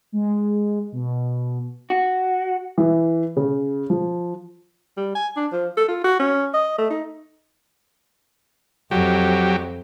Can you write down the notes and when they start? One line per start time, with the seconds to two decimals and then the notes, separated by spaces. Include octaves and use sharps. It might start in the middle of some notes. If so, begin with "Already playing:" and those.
0.12 G#3
0.92 B2
1.90 F#4
2.78 E3
3.36 C#3
3.90 F3
4.97 G3
5.15 G#5
5.37 D4
5.52 F3
5.77 A4
5.88 F4
6.04 F#4
6.20 C#4
6.54 D#5
6.78 A3
6.90 D#4
8.91 F2 F#3 G4